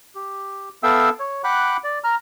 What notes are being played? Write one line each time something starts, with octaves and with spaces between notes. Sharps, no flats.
G4
B3 A4 E5 F5 G5 E6
C#5
F#5 G5 B5 D6 F#6
D5
A#5 F6